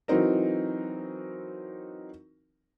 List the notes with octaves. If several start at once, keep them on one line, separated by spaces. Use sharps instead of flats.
E3 F#3 C4 D#4 A#4